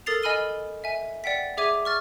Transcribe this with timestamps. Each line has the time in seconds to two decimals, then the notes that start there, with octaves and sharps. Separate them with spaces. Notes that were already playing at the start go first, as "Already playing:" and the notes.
0.06 A4 A#4 D#6 A6 C7 F7
0.23 D#5 G#5 B5 F6 D#7 G7
0.84 E5 G#5
1.24 D5 F#5 G5 B6
1.57 G#4 E5 D6 G#6 D#7
1.85 C#6 F6 A6